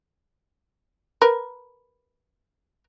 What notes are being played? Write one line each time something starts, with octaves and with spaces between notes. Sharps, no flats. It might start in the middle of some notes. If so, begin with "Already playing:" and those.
A#4 B4